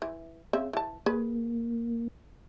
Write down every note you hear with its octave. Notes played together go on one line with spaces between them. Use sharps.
E3
C#3 C4 E5
E3 A5
A#3 G#4 B4